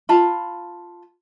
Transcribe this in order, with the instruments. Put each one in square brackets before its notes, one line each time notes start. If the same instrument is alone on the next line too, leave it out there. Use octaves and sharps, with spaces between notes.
[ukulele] F4 A5 B5